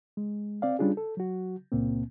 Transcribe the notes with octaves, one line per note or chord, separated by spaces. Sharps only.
G#3
C4 D5 F5
G3 C#4 D4 F4 G#4
A4
F#3 F#4
C#2 A#2 A#3 C4